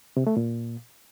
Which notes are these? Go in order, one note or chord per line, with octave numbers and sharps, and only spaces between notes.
C3
A3
A#2